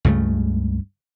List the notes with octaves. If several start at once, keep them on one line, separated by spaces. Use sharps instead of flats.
C#2 G2 C#3 A3